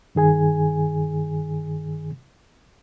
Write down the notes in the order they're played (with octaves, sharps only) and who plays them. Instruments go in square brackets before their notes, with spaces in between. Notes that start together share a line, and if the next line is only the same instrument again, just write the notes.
[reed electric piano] G2 D#3 G#4 G#5